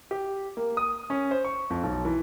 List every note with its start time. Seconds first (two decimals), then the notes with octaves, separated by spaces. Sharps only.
0.11 G4
0.57 A#3
0.77 D#6
1.10 C#4
1.31 C5
1.45 C#6
1.70 F2
1.83 B1
2.05 E3